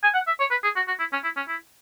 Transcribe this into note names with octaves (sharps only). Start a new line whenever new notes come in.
G#5
F#5
E5
C#5
B4
G#4
F#4
F#4
E4
C#4
E4
C#4
E4